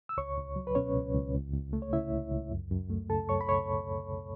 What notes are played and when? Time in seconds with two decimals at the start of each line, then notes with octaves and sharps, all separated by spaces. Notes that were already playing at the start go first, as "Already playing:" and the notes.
0.09 E6
0.17 C#2 C#5 C#6
0.37 C#2
0.56 F#3
0.67 B4
0.75 B2 C#4 C#5
0.95 C#2
1.15 C#2
1.34 C#2
1.53 C#2
1.73 A3
1.82 C#5
1.93 C#3 E4 E5
2.12 C#2
2.31 C#2
2.52 F#2
2.71 F#2
2.90 A3
3.10 C#3 A4 A5
3.29 F#2 C#5 C#6
3.41 B5
3.49 C#5 C#6